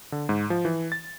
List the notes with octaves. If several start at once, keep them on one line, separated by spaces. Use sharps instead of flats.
D3
G#2
F3
E3
A6